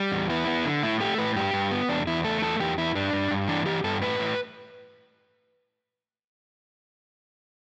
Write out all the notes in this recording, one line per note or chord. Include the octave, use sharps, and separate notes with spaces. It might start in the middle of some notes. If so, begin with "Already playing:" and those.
Already playing: G3
E2
B3 E4
B3
D3
A2 E4
A3 G4
A2 B4
G2 G4
G2
B3
E2 D4
E2 E4
A3 A4
E2 A4
E2 G4
E2 E4
G2 D4
G2
G2
E3 D4
E3 G4
G2 A4
A2 B4
A2